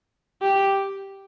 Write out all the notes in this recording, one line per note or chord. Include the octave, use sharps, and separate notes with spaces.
G4